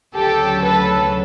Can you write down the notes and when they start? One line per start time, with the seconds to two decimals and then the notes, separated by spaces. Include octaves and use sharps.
0.14 D2 C#3 F#3 G4 A4
0.63 A4 B4